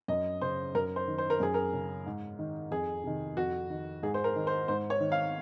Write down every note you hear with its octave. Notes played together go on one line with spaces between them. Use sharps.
F#2 D#5
C#3 C5
F#2 A#4
C5
D#3
C5
A#4
F#2 G#4
A#4
C#3
G#2
D#3
F2 G#4
C3 D#3
F2 F#4
D#3
G#2 G#4
C5
A#4
D#3
C5
G#2 C5
C#5
D#3
F5